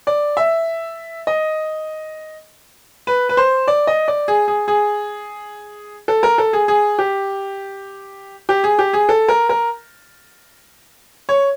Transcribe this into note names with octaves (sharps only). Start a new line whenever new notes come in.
D5
E5
D#5
B4
B4
C5
D5
D#5
D5
G#4
G#4
G#4
A4
A#4
A4
G#4
G#4
G4
G4
G#4
G4
G#4
A4
A#4
A#4
C#5